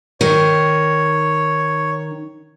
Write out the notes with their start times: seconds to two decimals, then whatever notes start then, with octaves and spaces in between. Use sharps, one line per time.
0.21 D#3 C#5